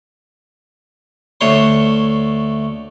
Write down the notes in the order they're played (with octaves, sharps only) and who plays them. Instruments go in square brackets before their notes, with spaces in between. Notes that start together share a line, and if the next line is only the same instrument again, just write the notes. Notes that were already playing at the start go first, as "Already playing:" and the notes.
[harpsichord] D2 A3 C#5 C6